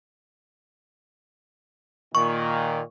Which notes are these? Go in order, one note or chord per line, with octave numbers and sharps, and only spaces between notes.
A#2 D#3 C#6